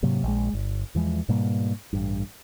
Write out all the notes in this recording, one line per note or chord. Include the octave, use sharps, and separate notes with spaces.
G#2 C3 F#3 A#3
A#1 G#3
G1
E2 E3 F3 G#3
G#2 B2 G3 A#3
A1 G2